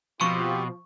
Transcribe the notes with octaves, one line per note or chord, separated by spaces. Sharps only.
B2 F3 C4 F4 G4 C#6